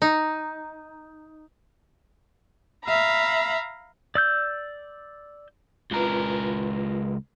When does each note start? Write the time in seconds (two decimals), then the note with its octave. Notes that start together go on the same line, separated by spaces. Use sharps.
0.02 D#4
2.84 E5 F5 A#5 B5
4.15 D5 E6 G6
5.91 C#2 F4 A#4 B4